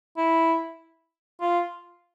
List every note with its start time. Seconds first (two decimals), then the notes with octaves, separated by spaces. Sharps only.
0.17 E4
1.41 F4